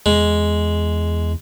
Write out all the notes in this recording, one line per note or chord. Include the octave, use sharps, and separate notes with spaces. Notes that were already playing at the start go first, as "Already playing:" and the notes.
E2 G#3